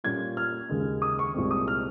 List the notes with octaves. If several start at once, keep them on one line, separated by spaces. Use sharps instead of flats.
A#2 G3 C#4 F4 G#6
F6
D#2 C#3 G#3
D#6
C#6
C2 A#2 G#3 C4
D#6
F6